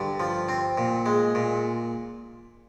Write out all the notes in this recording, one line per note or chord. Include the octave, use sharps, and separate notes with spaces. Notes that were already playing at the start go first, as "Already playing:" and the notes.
Already playing: G2 D3
F3
C4
A#2
G#3
A#2